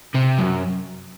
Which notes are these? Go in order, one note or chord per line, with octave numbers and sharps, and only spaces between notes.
C3
F#2